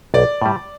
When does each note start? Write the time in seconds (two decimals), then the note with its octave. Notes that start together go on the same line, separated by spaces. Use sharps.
0.14 B1 D5
0.42 A2 G3